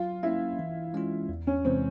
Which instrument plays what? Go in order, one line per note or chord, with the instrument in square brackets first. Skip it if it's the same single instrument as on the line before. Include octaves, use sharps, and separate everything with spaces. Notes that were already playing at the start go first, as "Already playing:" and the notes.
Already playing: [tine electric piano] F#3 [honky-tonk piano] F4
[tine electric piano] A#3 C#4 [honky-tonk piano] E4
[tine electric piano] E3
G#3 C#4 F4
E2
[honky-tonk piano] C#4
[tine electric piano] C3 E3 G#3 [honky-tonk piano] C4